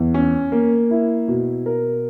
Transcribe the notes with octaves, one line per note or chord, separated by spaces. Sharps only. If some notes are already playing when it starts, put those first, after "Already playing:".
Already playing: E2
C#4
A#3
E4
B2
A#4